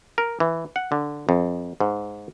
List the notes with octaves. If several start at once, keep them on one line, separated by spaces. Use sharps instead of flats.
A#4
E3
F#5
D3
F2
G#2